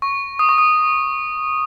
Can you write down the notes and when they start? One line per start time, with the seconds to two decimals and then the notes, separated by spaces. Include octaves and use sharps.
0.02 C#6
0.39 D#6
0.49 C#6
0.58 D#6